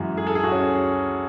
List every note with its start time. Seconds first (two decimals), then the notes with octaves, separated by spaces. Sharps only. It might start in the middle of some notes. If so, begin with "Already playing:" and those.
Already playing: F#2 E3 G#3 F#4
0.17 G#4
0.27 A4
0.35 G#4
0.44 F#4
0.52 C#4